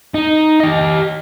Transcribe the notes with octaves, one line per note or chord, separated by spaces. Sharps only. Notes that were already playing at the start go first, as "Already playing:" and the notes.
D#4
G4 D#5